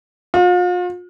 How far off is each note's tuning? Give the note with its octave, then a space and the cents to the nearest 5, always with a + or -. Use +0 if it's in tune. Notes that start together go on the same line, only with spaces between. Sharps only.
F4 +40